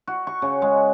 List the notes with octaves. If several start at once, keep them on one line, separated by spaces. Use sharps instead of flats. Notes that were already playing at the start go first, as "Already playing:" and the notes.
F#4
C#6
C#3
G#3